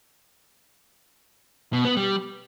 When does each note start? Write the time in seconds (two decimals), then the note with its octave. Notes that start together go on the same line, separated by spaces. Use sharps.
1.73 B2
1.85 B3
1.97 G3